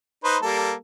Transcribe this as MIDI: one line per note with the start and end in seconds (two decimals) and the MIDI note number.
0.24 0.37 63
0.24 0.37 71
0.24 0.37 72
0.43 0.73 55
0.43 0.73 58
0.43 0.73 69